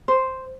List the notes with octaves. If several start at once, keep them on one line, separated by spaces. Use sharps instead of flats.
C5